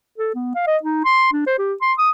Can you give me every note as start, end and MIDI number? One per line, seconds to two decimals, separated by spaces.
0.18 0.30 69
0.35 0.50 59
0.55 0.64 77
0.67 0.77 75
0.83 1.01 63
1.05 1.28 84
1.32 1.45 62
1.47 1.54 72
1.58 1.74 67
1.82 1.93 84
1.98 2.10 87